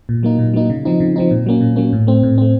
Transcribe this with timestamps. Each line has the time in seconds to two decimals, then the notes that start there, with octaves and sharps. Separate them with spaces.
0.09 A#2
0.23 F#3 A#3 D#4
0.39 A#2
0.54 F#3 A#3 D#4
0.70 C#3
0.85 F3 C4 D#4
1.00 C#3
1.16 F3 C4 D#4
1.31 A#2
1.46 F#3 A#3 C#4
1.61 A#2
1.76 F#3 A#3 C#4
1.93 A2
2.07 A3 C4
2.23 A2
2.38 A3 C4